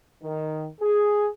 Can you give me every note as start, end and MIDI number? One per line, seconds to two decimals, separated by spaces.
0.23 0.67 51
0.81 1.29 68